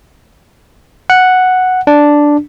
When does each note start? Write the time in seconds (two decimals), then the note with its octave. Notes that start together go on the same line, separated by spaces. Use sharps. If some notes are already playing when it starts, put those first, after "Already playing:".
1.10 F#5
1.87 D4